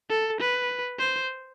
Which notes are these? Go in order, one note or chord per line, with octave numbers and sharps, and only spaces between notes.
A4
B4
C5